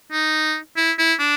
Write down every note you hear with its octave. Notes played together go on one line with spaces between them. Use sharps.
D#4
E4
E4
D4